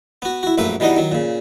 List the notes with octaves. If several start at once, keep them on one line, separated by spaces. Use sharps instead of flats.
B3 F#4
E4 F#4
A#1 F#2 A3 A#3 B4 E5
B2 E3 G3 D#4 D#5 F#5
D#3 F#3
A#2 C#3